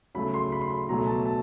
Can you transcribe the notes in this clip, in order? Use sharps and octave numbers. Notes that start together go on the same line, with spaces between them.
C#3 F#3 A3 B5
C6
B5
C6
B5
B2 F#3 A3 A#5
A5
A5